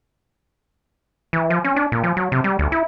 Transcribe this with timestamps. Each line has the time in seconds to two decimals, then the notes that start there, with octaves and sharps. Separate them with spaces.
1.33 E3
1.50 F3
1.64 C#4
1.76 D4
1.92 A#2
2.04 F3
2.17 F#3
2.32 C3
2.44 G3
2.59 D2
2.72 E4